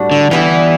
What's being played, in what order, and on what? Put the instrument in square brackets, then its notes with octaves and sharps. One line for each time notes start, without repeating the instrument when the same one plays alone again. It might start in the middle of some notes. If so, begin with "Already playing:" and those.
Already playing: [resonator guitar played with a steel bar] A2 G3 D4 F#4
[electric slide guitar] D3
[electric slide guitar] E3 [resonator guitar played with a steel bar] G3 B3 E4